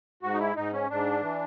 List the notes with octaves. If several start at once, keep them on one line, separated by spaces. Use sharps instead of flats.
G#2 F#4
D#4
E4
G#2 D#4
C#4
G#2 D4
E3